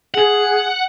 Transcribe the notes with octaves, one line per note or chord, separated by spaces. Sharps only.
G#4 F#5